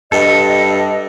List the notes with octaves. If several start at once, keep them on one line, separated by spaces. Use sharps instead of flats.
G2 A4 D#5